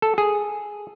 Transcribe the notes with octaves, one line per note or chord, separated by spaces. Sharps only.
A4
G#4